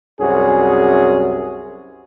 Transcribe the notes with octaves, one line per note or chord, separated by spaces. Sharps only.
C2 F#2 C#4 F#4 G#4